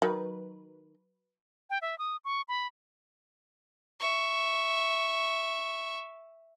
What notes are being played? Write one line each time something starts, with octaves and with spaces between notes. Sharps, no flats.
D#3 F#3 B4
G5
E5
D#6
C#6
B5
E5 C#6